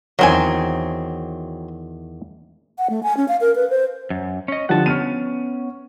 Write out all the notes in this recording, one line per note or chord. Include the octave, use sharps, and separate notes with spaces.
E2 D#3 F#3 C4 G#5
F#5
A3
G#5
C#4
F5
A#4
B4
C5
F#2
C#4 D#5
D3 F3 G3 F#5 A5
B3 C#4 F6 D#7